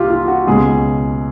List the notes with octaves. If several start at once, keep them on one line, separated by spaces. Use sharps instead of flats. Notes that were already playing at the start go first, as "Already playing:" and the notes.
Already playing: C2 F4 G4
F4
F#4
C#2 B2 G#3 G#4